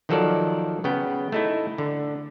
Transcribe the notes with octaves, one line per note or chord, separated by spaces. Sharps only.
D#3 F3 F#3 A4 A#4 D5
C#3 B3 G5
A3 D#4 E4
D3